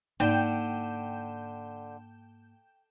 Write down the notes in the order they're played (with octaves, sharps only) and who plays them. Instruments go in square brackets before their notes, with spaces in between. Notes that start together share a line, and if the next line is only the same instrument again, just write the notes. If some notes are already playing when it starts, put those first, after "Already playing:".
[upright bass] G#2 A#3 [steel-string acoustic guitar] D3 [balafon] D#4 D5 [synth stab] G5 G6 E7